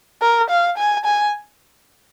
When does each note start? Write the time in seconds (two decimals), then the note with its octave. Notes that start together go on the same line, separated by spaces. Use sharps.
0.22 A#4
0.50 F5
0.78 G#5
1.05 G#5